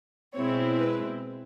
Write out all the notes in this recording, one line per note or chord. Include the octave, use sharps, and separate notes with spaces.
B2 G#3 C4 E4 C#5
B4